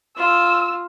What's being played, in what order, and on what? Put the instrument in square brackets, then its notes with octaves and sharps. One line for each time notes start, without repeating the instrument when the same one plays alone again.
[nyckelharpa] F4 [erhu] E6